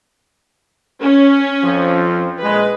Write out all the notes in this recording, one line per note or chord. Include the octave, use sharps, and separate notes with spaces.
C#4
F2 F3
A#1 G#3 B4